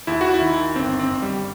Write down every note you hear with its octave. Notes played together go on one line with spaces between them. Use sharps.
D#2 E4
F#4
E4
D#3
G1 C4
C4
G1
G3